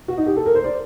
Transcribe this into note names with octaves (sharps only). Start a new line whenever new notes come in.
F#4
D#4
G4
A4
A#4
C5
D5